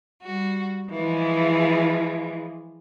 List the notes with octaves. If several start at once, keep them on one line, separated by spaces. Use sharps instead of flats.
G3 F#4
E3 F3 G#3